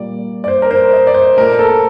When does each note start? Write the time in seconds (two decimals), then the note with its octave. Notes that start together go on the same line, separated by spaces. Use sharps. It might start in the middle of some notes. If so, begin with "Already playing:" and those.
Already playing: A#2 G3 A#3 D5
0.44 D5
0.48 C5
0.62 A#4
0.71 C5
0.93 D#5
1.07 D5
1.14 C5
1.37 A#2 A3 A#4
1.59 A4